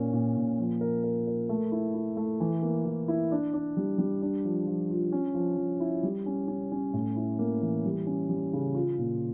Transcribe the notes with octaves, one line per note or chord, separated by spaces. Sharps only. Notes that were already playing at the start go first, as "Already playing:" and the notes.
Already playing: A#2 C#4 A#4
A#2
A#2
F3
A#4
A#4
A#4
A3
E4
E4
A3
E3
A#3
E3
E4
D4
D4
G3
G3
D4
F3
F3
F4
C#4
F3
F3
E4
G3
C#4
C#4
C#4
A2
E4
A#3
E3
G3
C#4
G3
C#3
F4
A#2